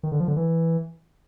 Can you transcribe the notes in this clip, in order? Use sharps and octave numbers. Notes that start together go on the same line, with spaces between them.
D#3
D3
F3
D3
E3